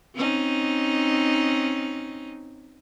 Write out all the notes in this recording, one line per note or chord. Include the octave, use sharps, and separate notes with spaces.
C4 C#4 D#4